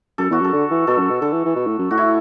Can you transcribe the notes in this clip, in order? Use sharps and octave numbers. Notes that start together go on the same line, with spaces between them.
F#2 A4
E2 F#4
F#2
A4
D3
E3
B2 A4
F#2
B2
D3 A4
E3
E3
B2
A2
F#2
A2 F#4
E4